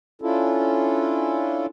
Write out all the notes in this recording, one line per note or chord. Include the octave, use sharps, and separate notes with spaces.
C#4 D4 E4 F4 A4